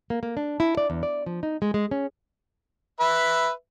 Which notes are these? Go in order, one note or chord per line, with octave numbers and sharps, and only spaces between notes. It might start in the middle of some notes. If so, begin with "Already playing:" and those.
A#3
A#3
D4
E4
D5
E2
D5
F3
D#4
G#3
G#3
C#4
B4 E5